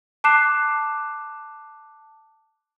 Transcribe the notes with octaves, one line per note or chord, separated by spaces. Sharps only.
A5 D6 F#6 C7 E7